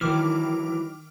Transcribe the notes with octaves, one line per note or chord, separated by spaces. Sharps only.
D#3 E3 F#3 D6 F6